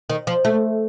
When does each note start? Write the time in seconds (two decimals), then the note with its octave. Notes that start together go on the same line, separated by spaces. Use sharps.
0.10 D#3
0.27 F3
0.45 A3